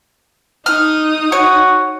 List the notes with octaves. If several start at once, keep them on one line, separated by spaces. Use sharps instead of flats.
D#4 D#6 F6
F#4 C#5